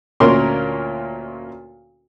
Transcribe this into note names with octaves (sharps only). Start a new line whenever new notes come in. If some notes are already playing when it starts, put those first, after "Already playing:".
D2 A#2 C#4 A#4 C6